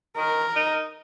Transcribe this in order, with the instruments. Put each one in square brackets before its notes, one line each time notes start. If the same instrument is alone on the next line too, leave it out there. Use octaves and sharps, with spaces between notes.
[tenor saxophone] D#3 [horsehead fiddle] A#4
[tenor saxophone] D#4